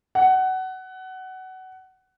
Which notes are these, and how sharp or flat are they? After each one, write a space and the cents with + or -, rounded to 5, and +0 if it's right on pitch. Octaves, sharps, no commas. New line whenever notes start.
F#5 +20